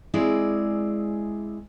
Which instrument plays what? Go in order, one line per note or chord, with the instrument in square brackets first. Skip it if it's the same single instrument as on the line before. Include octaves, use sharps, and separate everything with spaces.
[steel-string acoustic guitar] G#3 C4 E4 G#4 D5